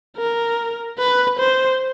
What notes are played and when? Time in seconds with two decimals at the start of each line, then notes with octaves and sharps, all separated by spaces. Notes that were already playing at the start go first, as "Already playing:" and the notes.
0.17 A#4
0.99 B4
1.40 C5